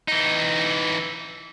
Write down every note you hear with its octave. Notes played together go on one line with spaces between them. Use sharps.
E3 D#4